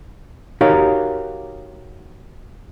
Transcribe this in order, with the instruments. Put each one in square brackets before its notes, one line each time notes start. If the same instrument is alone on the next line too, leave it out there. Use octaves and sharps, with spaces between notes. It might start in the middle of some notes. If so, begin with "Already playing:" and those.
[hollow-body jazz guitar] D#4 F#4 G4 A#4 C#5 F5